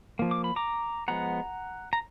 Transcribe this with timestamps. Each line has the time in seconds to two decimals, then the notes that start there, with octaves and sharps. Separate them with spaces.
0.19 F3 A#3
0.31 D6
0.44 B5
0.56 A#5 D6
1.08 F3 G#3 B3 F#5 A#5
1.93 A#5